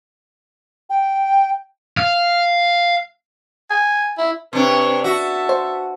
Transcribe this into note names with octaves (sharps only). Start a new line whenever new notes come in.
G5
F5
G#5
E4
C3 D4 B4 C#5
F#4 E5 A5
C5